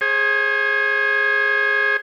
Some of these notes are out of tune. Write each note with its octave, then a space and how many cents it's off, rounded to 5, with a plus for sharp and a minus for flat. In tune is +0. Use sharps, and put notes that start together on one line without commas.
G#4 +0 C5 +45